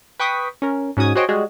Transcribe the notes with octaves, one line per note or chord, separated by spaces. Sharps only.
B4 G5 C#6 D#6 B6
C#4 A#4
G#2 C#4 F#4 D#6 G#6
F#4 G#4 C5 C#5 D#5 G5
G3 G#3 F#4 G#4